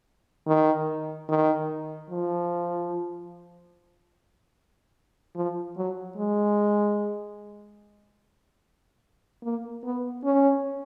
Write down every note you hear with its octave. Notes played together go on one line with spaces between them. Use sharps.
D#3
D#3
F3
F3
F#3
G#3
A#3
B3
C#4